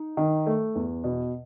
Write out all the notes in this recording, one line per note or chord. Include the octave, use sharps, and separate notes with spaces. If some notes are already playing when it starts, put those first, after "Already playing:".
Already playing: D#4
D#3
A3
E2
B2